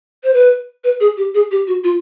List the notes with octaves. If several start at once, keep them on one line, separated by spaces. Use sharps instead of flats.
C5
B4
B4
G#4
G4
G#4
G4
F#4
F4